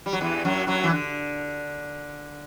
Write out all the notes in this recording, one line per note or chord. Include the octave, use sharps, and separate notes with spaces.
G3
F#3
E2 E3
F#2 F#3
F#2 F#3
E3
D3